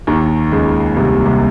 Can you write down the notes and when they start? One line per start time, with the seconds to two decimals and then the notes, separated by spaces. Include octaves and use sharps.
0.07 D#2 D#3
0.52 C#2 C#3
0.96 C2 C3
1.25 C2 C3